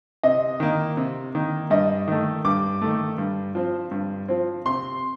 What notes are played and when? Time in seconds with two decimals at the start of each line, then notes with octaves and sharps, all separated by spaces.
0.23 C3 D#5
0.60 D#3 A#3
0.97 C3
1.35 D#3 A#3
1.70 G2 D#5
2.08 D#3 A3
2.45 G2 D6
2.81 D#3 A3
3.18 G2
3.55 F3 C4
3.91 G2
4.28 F3 C4
4.66 C3 C6